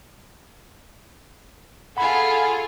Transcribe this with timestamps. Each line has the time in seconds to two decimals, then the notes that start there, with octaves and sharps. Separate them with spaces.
1.97 F4 G#4 A4 F#5 B5